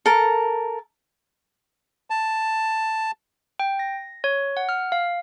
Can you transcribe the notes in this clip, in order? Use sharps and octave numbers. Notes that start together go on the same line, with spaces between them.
A4 A#4
A5
G5
A#6
C#5
F#5
F6
F5